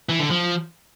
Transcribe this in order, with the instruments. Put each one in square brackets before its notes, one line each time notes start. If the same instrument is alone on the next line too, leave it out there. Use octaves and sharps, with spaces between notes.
[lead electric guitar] E3
D3
F3